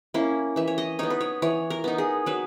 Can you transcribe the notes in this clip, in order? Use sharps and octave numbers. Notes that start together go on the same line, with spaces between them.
A#3 C#4 E4
E3 E5
C#5
D#5
B3 D#4 C#5
B4
C#5
E3 C#5
A#4
B3 D#4
G#4
F#3 B4